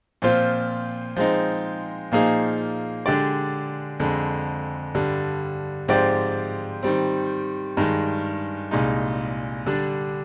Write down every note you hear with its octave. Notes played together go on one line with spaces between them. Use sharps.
A#2 F3 C4 F4 C5
F3 G#3 C4 D#4
A#2 F3 A#3 D#4 G#4
D3 G#3 D4 G4 D5
F2 D3 G#3
G2 D3 G3
G#2 F3 C4 G4 D5
D#3 G3 C4
G2 D#3 G#3
C2 A#2 G#3 D#4
D3 G3 D4